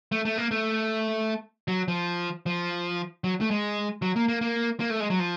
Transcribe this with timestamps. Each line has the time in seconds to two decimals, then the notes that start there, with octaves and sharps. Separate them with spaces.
0.12 A3
0.25 A3
0.38 A#3
0.51 A3
1.68 F#3
1.88 F3
2.46 F3
3.24 F#3
3.41 A3
3.51 G#3
4.02 F#3
4.16 A#3
4.28 A#3
4.41 A#3
4.80 A#3
4.90 A3
5.00 G#3
5.10 F#3
5.19 F3